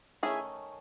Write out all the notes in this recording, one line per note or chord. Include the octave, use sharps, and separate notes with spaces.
D#3 A3 C#4 E4 G#4